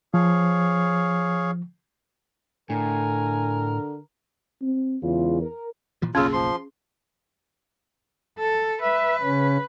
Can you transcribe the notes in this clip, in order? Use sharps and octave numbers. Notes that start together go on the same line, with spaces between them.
F3 G#4 C#5 F5
A2 D3 A#4 G#5
C4
E2 C#3 G#3 F4
A#4
A#2 E3 F3
F#1 B1 C#3 A#3 C#4 F4 G#4
F3 C6
A4
B4 E5
C#3 C#4